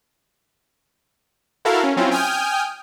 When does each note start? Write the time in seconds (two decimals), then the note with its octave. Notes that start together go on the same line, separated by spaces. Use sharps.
1.65 E4 F#4 A4 A#4 F5
1.84 C#4
1.97 F#3 C4 C#4 E4 F4
2.11 G5 G#5 D#6 F6 G6